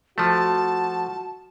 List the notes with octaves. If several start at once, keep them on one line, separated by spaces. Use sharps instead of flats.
F3 A3 F#4 A5